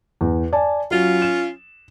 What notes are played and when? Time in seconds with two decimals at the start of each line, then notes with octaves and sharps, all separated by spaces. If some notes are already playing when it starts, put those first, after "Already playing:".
0.21 E2
0.53 D5 G#5 A5
0.91 F#3 C#4 F4
1.22 E7